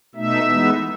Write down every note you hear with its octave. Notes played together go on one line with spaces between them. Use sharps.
B2 A3 D#4 E5
E3 G#3 B3 D#4